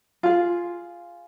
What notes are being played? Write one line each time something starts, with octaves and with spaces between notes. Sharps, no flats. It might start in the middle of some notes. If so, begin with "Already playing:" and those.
F4 G#4